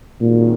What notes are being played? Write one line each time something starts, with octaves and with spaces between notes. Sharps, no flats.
G#1 F#2 A#2 D#3